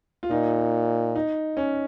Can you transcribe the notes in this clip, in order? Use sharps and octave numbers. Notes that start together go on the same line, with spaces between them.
F4
A#2 D#4
D#4
C#4